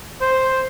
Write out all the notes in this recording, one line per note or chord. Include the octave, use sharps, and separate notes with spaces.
C5